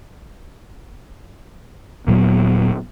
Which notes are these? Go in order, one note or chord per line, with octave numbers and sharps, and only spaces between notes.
D#1 A#2 F#3 B3